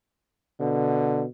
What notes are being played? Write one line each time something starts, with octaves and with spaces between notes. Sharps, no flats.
B2 D3